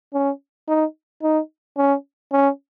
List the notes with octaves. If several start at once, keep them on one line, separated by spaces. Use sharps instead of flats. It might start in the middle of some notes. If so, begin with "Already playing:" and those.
C#4
D#4
D#4
C#4
C#4